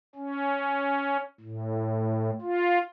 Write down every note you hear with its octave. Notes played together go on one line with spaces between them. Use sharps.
C#4
A2
F4